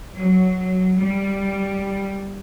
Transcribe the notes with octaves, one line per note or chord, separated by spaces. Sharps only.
F#3
G3